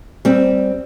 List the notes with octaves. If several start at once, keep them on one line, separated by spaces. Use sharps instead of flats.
G3 C4